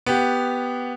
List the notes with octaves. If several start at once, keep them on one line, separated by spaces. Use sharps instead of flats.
B3 G4